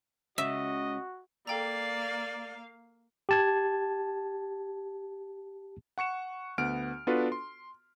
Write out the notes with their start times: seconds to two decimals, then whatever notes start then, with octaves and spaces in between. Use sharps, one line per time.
0.38 C#2 C#3 F#4 D#5 E5
1.47 A#3 A4 D5 F5 G5 A#5
3.29 G4 A5 G#6
5.98 F#5 C#6 C#7 E7
6.58 D2 B3 F#5 F6 D7
7.07 B3 D4 F4 F#4 A4 B4
7.32 C6